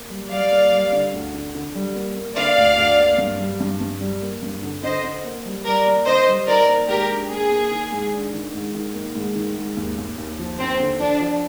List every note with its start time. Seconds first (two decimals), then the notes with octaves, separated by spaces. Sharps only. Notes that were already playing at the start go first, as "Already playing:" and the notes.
Already playing: A#3
0.10 G3
0.31 G3 D5 F5
0.51 A#3
0.73 G3
0.92 D3
1.14 D2
1.34 D3
1.55 D3
1.75 G3
1.95 A#3
2.16 A#3
2.36 D3 D5 F5
2.56 D2
2.78 D2
2.99 A#3
3.18 G2
3.40 G3
3.60 G2
3.81 G2
4.01 G3
4.22 A#3
4.42 G2
4.63 D3
4.83 D3 C5 D#5
5.04 D3
5.25 A#3
5.45 G3
5.65 G3 A#4 D5
5.86 A#3
6.07 D3 C5 D#5
6.28 G3
6.47 D#3 A#4 D5
6.68 A#3
6.88 G#2 G4 A#4
7.09 D4
7.30 A#3 G#4
7.50 A#3
7.71 D#3
7.92 G#2
8.13 D4
8.33 D#3
8.53 G#2
8.75 D#3
8.94 A#3
9.15 G#2
9.35 D#3
9.56 G#2
9.77 D#2
9.98 D#2
10.18 D#2
10.39 F3
10.58 D#2 C4
10.80 D3
11.00 F3 D4
11.20 F3